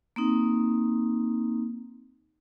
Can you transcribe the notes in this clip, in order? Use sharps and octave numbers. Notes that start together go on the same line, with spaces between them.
A#3 C4 D#4